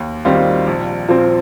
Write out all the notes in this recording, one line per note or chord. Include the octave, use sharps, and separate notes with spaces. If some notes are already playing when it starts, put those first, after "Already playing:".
Already playing: D#2
D#3 G3 C4 F4
A#1
A#2 F3 C4